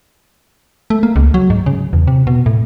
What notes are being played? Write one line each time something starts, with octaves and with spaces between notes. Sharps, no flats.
A3
A#3
C#2
F#3
G#2
C#3
E2
C3
B2
A2